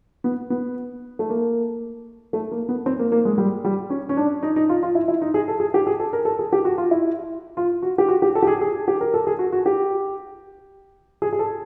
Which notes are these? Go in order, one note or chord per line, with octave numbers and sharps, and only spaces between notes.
B3
B3
A3
A#3
A3
A#3
B3
C4
A#3
A#3
G#3
G3
G3
C#4
C#4
D4
D#4
D#4
F4
F4
E4
E4
D#4
G#4
A4
G#4
G4
G#4
A4
A#4
A4
G#4
G4
F#4
F4
E4
F4
F#4
G4
F#4
G4
A4
G4
G#4
G#4
G4
A#4
A4
G#4
F#4
F#4
G4
G#4
G#4
A4